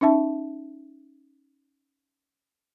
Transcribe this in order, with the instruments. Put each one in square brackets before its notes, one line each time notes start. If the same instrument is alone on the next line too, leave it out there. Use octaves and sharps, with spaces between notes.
[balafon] C#4 D#4 E5 A5